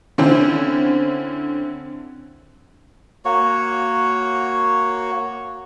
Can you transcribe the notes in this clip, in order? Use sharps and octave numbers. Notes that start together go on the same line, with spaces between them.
D3 C4 C#4 E4
A#3 F#4 C#5